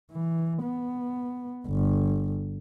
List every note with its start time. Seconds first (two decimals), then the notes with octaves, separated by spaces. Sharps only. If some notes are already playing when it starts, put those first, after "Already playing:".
0.12 E3
0.63 B3
1.67 G1